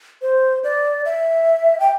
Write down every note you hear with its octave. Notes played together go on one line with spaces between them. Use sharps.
C5
D5
E5
G5